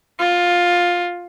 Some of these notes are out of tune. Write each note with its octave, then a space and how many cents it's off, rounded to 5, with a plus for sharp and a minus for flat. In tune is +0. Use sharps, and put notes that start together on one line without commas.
F4 +10